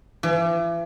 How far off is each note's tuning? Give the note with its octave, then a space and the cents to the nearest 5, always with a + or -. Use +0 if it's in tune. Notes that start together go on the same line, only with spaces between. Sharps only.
E3 +40